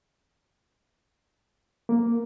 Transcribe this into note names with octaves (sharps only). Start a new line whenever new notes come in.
A#3